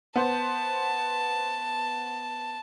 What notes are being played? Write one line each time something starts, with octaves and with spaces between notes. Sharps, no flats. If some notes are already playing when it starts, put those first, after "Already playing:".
B3 C5 A5